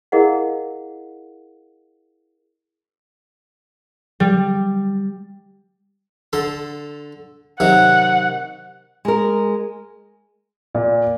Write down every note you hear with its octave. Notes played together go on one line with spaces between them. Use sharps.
E4 G#4 A#4 D#5 F5 F#5
G3
D3 A4 C6
C3 D#3 F#3 F#5
G#3 A#4
A#2